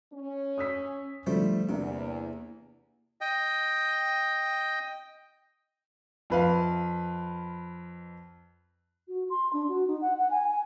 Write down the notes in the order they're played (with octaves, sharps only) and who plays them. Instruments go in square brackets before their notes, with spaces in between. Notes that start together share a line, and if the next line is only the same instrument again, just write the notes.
[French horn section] C#4
[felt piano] D#6 E6 B6
[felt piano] D3 F3 [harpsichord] G3 A3 C5
[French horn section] E2 [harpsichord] C3 [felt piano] A#3 D4
[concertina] D#5 G5
[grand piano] F2 B4 F5
[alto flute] F#4
C6
D4
F#4
D#4
F#5
F#5
G#5
G#5